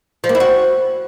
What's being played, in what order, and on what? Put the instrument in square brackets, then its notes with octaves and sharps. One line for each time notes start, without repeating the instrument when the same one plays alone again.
[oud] F3
A#3
E4
F#4